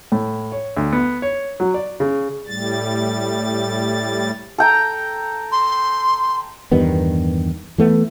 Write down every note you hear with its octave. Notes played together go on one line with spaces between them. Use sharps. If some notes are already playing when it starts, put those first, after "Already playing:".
A2
C#5
D2
B3
C#5
F#3
D5
C#3
A2 G3 A6
A4 G5 A#5
C6
E2 G2 D#3 B3
E3 A3 B3